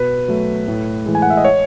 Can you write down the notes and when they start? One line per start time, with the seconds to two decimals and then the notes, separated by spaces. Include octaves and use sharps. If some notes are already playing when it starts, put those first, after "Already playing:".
Already playing: B2 B4
0.28 F#3 A3
0.68 A2
1.06 E3 G#3
1.15 G#5
1.22 F#5
1.30 E5
1.37 D#5
1.45 C#5